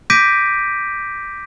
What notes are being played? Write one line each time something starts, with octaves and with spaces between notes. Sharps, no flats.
D6 G6 A#6 B6 D7 D#7